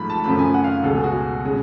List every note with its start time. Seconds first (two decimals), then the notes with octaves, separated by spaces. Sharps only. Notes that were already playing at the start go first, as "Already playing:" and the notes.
Already playing: G#2 F3 A3 B5
0.10 A5
0.24 F#2 C#3 F3 A3 B5
0.39 G#5
0.54 F#5
0.64 F5
0.84 C#2 B2 G#3 A4
0.94 G#4
1.04 F#4
1.45 C#3 G#3